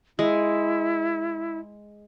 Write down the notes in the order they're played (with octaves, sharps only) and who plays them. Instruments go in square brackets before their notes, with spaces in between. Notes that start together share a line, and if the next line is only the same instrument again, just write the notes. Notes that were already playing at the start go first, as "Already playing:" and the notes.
[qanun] G#3 [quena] E4